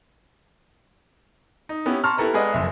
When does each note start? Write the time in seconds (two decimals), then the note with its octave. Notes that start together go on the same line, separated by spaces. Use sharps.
1.69 D#4
1.86 B3 C#4 E4 G4
2.04 A5 A#5 C6 C#6 F6
2.18 E4 G4 A4 B4 A#5
2.34 G#3 G#4 B4 D5 D#5 F#5
2.53 F#1 F2 E5